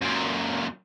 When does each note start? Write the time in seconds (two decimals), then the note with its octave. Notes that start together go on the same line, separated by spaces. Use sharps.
0.01 F#2 A#2